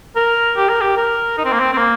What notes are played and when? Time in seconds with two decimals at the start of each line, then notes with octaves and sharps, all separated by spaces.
0.16 A#4
0.57 G4
0.69 A#4
0.81 G4
0.97 A#4
1.37 D#4
1.45 C4
1.53 A#3
1.60 C4
1.73 C4
1.78 A#3